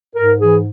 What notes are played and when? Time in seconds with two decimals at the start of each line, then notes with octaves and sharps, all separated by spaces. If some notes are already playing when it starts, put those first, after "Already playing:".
0.16 G#2 A#4
0.40 E3 G#4